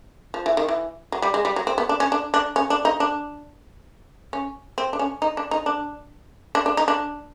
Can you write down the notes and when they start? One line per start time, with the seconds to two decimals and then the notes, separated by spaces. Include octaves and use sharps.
0.34 F3
0.46 E3
0.57 D#3
0.69 E3
1.12 F#3
1.22 G3
1.34 G#3
1.45 G3
1.56 F#3
1.67 C4
1.78 B3
1.89 D4
2.00 C#4
2.12 D4
2.34 D4
2.56 C#4
2.70 D4
2.85 D#4
3.00 D4
4.33 C#4
4.78 C4
4.93 D4
4.99 C#4
5.22 D#4
5.37 D4
5.51 D#4
5.66 D4
6.55 D4
6.66 D4
6.77 D#4
6.88 D4